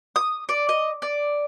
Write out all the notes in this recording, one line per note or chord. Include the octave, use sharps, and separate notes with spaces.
D#6
D5
D#5
D5